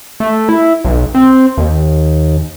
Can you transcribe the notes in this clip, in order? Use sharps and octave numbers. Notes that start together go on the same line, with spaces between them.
A3
E4
B1
C4
D#2